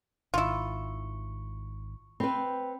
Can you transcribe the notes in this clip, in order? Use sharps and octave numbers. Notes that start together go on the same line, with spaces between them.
G#1 D#3 E4 F4 C#6
C4 B4 G5 B5